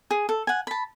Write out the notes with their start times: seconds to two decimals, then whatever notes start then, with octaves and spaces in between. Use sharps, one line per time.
0.11 G#4
0.29 A4
0.47 F#5 G#5
0.67 A5 B5